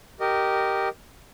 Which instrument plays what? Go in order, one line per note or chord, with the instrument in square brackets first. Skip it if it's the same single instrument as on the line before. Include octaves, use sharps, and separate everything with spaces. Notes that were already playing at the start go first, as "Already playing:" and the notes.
[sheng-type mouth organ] G4 A#4 D#5